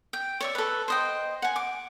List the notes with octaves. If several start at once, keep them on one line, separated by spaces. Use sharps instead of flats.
G5
C#5 D5 E5
A4 B4
C5 D#5 G5
F#5 G#5
D6